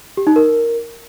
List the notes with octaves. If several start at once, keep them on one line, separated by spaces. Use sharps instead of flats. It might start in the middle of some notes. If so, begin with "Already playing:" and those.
G4
D#4
A#4